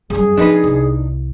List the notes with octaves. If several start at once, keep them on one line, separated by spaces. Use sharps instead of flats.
F#2 G3 G#4
F3 C4 D4 D#4 B4
C2